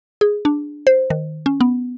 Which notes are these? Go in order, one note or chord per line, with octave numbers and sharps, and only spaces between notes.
G#4
D4
C5
D#3
C#4
B3